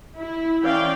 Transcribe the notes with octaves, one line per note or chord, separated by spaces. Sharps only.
E4
E3 C#4 D5 F5 G5